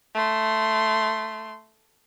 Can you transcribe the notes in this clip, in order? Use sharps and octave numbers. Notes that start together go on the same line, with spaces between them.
A3 C6